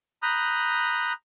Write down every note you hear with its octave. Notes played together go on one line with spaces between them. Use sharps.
A#5 B5 D#6 F#6 G6